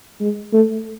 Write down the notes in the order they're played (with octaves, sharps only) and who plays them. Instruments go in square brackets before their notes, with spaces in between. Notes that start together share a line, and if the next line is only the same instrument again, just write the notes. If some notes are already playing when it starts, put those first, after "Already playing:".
[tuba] G#3
A3